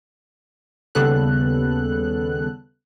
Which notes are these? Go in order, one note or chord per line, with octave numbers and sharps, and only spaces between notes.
D#2 C#3 G3 B3 A4 F#6